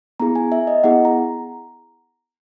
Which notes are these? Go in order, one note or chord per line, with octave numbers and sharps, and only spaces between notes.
B3 E4 G#4 A#5
G#5
E5
D#5
B3 E4 G#4 F#5
A#5